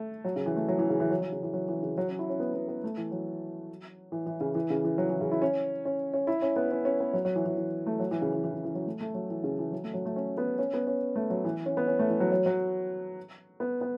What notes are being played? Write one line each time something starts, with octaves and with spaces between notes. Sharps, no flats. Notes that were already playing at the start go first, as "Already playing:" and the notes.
Already playing: A3
F#3
C#3
E3
A3
F#3
E3
C#3
E3
F#3
F#3
C#3
E3
F#3
E3
C#3
F#3
C#4
E4
C#4
B3
B3
B3
A3
E3
F#3
E3
E3
C#3
E3
C#3
E3
F#3
E3
C#3
E4
C#4
C#4
C#4
E4
C#4
B3
C#4
C#4
B3
F#3
F#3
E3
E3
E3
A3
F#3
E3
C#3
E3
E3
C#3
E3
F#3
A3
A3
F#3
E3
C#3
E3
F#3
A3
F#3
A3
C#4
B3
C#4
B3
C#4
A3
F#3
E3
C#4
B3
C#4
A3
E3
F#3
F#3
F#3
B3
B3